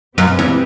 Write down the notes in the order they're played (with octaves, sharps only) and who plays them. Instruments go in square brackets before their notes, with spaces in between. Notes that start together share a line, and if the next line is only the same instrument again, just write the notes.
[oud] F#2 [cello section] E3 G3 C4 G4 B4
[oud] E2